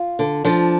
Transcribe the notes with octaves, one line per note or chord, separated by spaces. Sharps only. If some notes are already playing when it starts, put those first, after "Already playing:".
Already playing: F4
D3
F3 D4